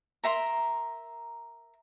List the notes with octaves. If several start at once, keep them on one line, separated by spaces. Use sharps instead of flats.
A#4 E5 A#5 C6